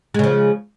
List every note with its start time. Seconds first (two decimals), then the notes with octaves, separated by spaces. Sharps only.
0.14 G#3
0.19 C#3
0.24 F3